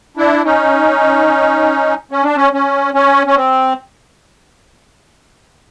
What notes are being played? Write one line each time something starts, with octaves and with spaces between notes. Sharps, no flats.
D4 E4
C#4 D#4
C#4
D4
C#4
C#4
C#4
C#4
C4